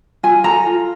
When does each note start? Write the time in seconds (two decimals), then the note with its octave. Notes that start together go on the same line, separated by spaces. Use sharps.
0.23 F4 G#5
0.44 A4 A#5
0.66 F4